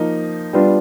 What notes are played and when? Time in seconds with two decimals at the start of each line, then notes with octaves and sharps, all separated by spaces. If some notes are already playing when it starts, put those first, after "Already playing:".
Already playing: F3 A#3 D#4
0.53 G3 B3 D4 F4